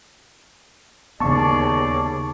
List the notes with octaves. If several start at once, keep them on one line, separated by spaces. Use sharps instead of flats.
D#2 C#3 B3 G#4 D5 A5 C#6